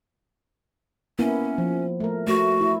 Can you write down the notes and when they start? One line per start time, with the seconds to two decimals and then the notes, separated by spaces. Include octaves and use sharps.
1.19 A#3 B3 C#4 E4
1.58 F3
2.00 A3 A#4
2.27 A3 F#4
2.61 E4